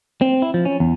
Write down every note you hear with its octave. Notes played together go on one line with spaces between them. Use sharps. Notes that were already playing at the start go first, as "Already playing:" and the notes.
C4
E4
F3
C#4
E2